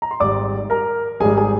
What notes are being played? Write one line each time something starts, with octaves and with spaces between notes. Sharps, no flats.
A#5
C6
G#1 G#2 G3 D5 D6
A#4 A#5
G#1 G#2 G3 G#4 G#5
G#4 G#5